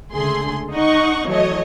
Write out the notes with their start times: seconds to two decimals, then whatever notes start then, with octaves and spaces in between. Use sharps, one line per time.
0.13 C#2 D3 A3 G#4 C6
0.72 D#4 D#5 F#5 C#6
1.27 E3 F#3 A3 C#5 D#5